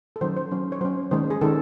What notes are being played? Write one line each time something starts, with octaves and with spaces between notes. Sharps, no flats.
A4
D#3 F#3 C#4 C5
C5
F#3 C#4
C#5
F#3 C#4 C5
D#3 G#3 C#4 C5
G#4
D#3 G#3 C#4 A4